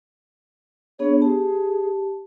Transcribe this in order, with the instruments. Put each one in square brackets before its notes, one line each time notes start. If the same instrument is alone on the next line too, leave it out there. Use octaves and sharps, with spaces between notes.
[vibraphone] B3 D4 G#4 [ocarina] C#5
[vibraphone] G4 A5 [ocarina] G#4